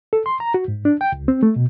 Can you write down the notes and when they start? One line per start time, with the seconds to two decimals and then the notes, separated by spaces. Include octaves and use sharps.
0.13 A4
0.26 C6
0.40 A#5
0.54 F#4
0.68 G#2
0.85 D4
1.01 G5
1.12 C#2
1.28 C4
1.43 A3
1.56 B2